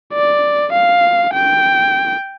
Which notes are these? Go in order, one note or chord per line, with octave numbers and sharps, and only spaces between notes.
D5
F5
G5